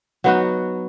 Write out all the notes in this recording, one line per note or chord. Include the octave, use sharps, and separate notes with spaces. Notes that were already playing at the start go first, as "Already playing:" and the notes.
F#3 B3 D#4 F#4